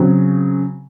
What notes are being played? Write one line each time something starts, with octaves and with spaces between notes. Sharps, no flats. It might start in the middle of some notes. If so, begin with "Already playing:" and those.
Already playing: C#3 F#3 C4